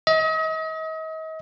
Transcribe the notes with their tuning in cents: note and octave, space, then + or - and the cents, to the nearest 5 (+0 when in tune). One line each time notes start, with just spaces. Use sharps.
D#5 +40